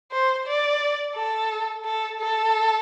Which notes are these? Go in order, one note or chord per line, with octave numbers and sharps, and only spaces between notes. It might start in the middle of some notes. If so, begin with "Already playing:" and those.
C5
D5
A4
A4
A4